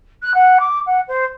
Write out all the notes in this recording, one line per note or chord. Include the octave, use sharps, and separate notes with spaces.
F#6
F#5
D6
F#5
C5